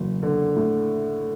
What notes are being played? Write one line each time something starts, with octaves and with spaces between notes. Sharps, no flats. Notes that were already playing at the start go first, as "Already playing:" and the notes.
Already playing: F#1 E2 F#3
D3
A2